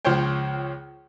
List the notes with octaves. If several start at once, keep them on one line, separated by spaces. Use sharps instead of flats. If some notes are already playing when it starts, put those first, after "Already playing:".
C#2 F3 C5 C#5 G5